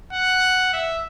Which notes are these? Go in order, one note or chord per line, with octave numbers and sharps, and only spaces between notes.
F#5
E5